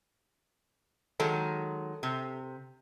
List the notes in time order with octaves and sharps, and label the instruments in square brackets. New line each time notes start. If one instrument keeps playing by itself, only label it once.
[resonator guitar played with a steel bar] D#3 F#3 G#3 [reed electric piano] A4
[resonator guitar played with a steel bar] C3